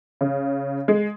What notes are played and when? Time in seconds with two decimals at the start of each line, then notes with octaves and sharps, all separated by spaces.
0.21 C#3
0.88 G#3